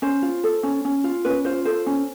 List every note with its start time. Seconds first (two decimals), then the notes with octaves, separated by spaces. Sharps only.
0.02 C#4 C5
0.22 F4
0.44 A4
0.63 C#4
0.85 C#4
1.04 F4
1.25 C#4 B4
1.45 F4 C5
1.65 A4 C5
1.86 C#4